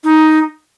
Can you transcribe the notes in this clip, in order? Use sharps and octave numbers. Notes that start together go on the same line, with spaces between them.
D#4